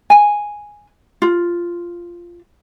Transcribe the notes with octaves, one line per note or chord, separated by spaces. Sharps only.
G#5
F4